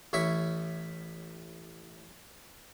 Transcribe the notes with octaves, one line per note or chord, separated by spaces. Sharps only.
A1 C#4 E4 E5 C#6